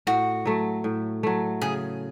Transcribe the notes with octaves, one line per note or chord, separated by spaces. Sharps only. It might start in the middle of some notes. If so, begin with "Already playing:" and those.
A2 F#4
F#3 A3
A2
F#3 A3
C#3 G#4